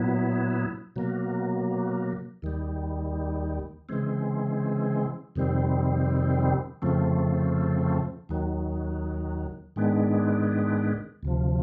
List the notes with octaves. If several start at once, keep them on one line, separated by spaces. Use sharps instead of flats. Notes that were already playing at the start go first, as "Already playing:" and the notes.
Already playing: A#2 F#3 B3 E4
B2 F#3 A#3
D#2 D#3 G3
C#3 E3 G#3 C4
F2 C3 D#3 G3 C4
F2 C#3 F3 A3 C4
D#2 D#3 F#3
G#2 D#3 G#3 B3 D4
D2 C3 F3